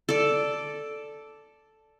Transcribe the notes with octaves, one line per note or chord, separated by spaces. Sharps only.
A4 D5